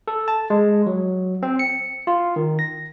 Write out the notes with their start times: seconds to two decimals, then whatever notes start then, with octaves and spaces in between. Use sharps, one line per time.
0.08 A4
0.28 A5
0.50 G#3
0.86 F#3
1.43 C4
1.59 C#7
2.07 F4
2.36 D#3
2.59 A#6